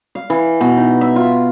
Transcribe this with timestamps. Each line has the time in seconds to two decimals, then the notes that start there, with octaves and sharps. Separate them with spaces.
0.15 F5
0.30 E3
0.61 B2
0.77 D#4
1.01 E5
1.16 F4